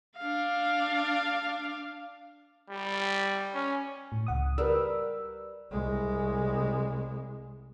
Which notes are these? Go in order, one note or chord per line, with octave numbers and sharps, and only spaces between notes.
D4 F5
G3
C#4
A2
C#2 F#5 D#6
G3 A#4 B4 E6
C2 G#3